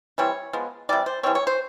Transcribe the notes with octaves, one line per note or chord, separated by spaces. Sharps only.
E3 G3 C4 C#5
F3 G#3 B3
C3 E3 G3 D5
C5
E3 G3 C4 C#5
C#5
C5